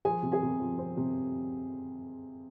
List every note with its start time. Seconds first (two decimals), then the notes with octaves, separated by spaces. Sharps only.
0.05 F3 G#4 G#5
0.23 C3
0.32 G#4 G#5
0.42 C3
0.60 F3
0.79 C4
0.97 C3